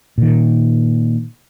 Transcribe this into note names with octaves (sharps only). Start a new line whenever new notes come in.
A#2 D#3